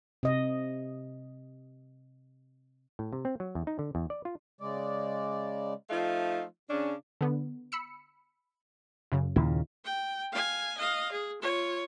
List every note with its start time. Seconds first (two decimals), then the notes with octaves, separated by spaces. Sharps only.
0.23 C3 D#5
2.99 A2
3.13 C3
3.25 C4
3.40 F#3
3.55 E2
3.67 D#4
3.79 D3
3.95 E2
4.10 D5
4.25 F4
4.61 C#3 G#3 D5
5.90 F3 A3 D#4 F4 F5
6.69 C#3 C#4 D4
7.21 D3 B3
7.72 B5 E6 C#7
9.12 F#2 C#3
9.36 D#2 A#2 C#3 E4
9.85 G5
10.32 F5 G#5
10.77 D#5 F5
11.12 G#4
11.42 F4 C#5